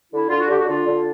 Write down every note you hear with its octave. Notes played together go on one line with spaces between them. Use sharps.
D3 E4
D3 F4
F#4
D3 G4
F#4
D3 F4
D3